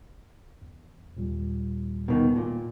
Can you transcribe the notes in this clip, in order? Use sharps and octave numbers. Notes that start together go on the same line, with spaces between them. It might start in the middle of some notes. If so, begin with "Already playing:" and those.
E2
D#2 A#2 G3
B2 D#3
A#2